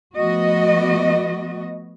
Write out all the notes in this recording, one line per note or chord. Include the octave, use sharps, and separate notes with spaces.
F3 A3 B3 F#4 D#5